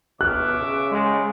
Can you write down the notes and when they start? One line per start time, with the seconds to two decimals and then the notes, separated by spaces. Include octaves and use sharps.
0.21 B2 C#5 E5 D6 F6 F#6
0.59 C#3
0.91 G#3